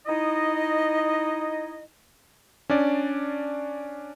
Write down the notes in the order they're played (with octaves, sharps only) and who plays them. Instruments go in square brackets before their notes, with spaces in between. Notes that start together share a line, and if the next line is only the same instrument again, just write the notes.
[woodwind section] D#4 E4 D#5
[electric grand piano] C#4 D4 D5